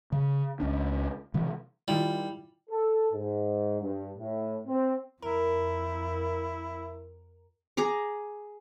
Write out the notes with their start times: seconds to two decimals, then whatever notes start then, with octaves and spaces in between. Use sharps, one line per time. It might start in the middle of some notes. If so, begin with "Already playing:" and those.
0.12 C#3
0.60 C#2 C#4 D4
1.34 C3 E3 F3
1.88 D#3 G3 E4 F4
2.70 A4
3.13 G#2
3.82 G2
4.18 A2
4.67 C4
5.22 F2 F3 E4 A#4
7.77 G#4 A#5 D6